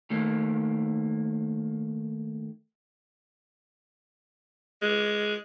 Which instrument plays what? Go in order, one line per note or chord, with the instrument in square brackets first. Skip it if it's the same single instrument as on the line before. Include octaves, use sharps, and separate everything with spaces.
[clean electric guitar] D#3 A3 A#3
[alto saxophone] G#3